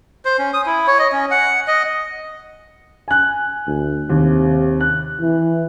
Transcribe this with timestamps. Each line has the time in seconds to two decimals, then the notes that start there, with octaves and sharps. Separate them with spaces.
0.25 C5
0.39 C#4
0.54 D#6
0.66 E4
0.87 C#5
0.99 D#5
1.12 C#4
1.31 F#5
1.68 D#5
3.08 G#5 F#6
3.66 D2
4.09 D#2 C3
4.81 F#6
5.21 E3